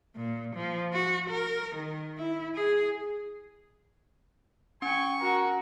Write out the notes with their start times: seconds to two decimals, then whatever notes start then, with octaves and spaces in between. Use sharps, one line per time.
0.15 A#2
0.55 F3
0.93 F#4
1.29 A#4
1.75 D#3
2.18 E4
2.55 G#4
4.82 C#4 G5 G#5 C#6
5.20 F#4 A#4